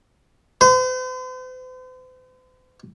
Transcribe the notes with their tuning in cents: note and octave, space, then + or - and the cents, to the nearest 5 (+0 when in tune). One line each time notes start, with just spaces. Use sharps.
C5 -45